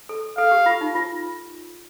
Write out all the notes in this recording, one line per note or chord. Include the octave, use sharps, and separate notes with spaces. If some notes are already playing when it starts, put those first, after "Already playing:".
A4
A4 F5
G4
F4
D#4
F4